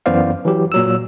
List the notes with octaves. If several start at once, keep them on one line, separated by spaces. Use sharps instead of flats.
F#2 E3 B3 C5 D5 F5
E3 F#3 G4
A#2 F#3 E6